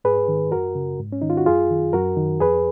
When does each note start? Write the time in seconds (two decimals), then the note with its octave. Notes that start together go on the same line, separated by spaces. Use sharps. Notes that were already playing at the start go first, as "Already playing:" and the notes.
0.04 G#2 G#4 B4
0.28 D#3
0.52 F#2 F#4 A#4
0.75 C#3
1.00 G#2
1.12 C#4
1.22 D#3 D#4
1.30 F4
1.37 F#4
1.46 F#2 F4 G#4
1.70 D#3
1.93 F#2 F#4 A#4
2.17 D#3
2.40 F2 G#4 B4